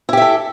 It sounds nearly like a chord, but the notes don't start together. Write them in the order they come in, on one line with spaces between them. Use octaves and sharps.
E4 G4 E5 A4